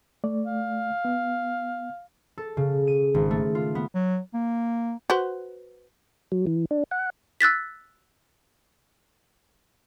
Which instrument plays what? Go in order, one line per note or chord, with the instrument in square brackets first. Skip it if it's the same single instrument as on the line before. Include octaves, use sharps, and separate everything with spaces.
[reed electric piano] A3 D5
[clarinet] F5
[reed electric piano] B3
[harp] A4
C#3
D#7
G#1
A3
F4
B3
[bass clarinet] F#3
A#3
[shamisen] F#4 B4 C5
[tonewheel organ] F#3
E3
D4
F#5
[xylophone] E6 F#6 A6 B6